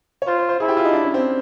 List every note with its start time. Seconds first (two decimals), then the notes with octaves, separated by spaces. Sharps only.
0.22 C#5
0.27 F4 C5
0.39 C5
0.49 C5
0.60 E4 G#4
0.68 G4
0.77 F4
0.85 D#4
0.93 D4
1.04 C#4
1.14 C4